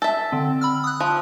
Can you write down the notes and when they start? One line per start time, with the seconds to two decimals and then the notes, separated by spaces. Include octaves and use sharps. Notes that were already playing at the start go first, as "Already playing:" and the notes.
0.02 A4 E5
0.32 D3 C4
0.61 B5 E6 F6
0.84 D#6 F#6
1.00 F3